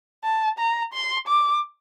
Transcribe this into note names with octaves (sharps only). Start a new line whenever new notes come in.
A5
A#5
C6
D6